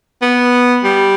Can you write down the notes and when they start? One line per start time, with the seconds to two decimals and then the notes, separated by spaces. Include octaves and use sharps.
0.22 B3
0.84 G3